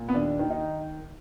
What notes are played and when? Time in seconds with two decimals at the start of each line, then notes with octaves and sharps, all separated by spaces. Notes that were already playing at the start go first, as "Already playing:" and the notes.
Already playing: A#2
0.08 B3
0.14 D#2 D4
0.39 D#3
0.50 D#4